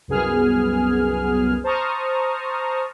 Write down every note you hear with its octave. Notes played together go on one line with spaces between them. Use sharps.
C2 F#2 B3 G#4 G#5 F6
C5 A5 A#5 C#6 D#6 F6